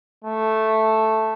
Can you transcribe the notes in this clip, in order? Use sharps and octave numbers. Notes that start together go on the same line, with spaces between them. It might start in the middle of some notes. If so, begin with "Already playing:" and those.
A3